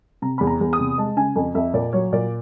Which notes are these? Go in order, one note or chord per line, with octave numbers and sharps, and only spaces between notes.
C3 A#5
E2 B5
A#5
E2
D#6
C3
G#3 A5
C#3 G#5
F2 G#5
F2 E5
A#2 D5
F#3 C#5
A#2 D5